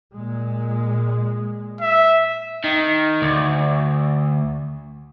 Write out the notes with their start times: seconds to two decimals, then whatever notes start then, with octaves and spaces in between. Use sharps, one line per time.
0.13 A#2 G#3
1.81 E5
2.64 D#3
3.22 D2